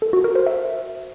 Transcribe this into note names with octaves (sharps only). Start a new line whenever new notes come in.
A4
F#4
A#4
C5
E5